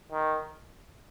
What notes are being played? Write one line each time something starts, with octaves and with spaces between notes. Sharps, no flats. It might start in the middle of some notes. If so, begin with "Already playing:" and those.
D#3